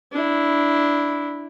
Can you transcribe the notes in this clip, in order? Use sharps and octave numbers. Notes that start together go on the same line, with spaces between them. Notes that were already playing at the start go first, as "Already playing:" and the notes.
D4 E4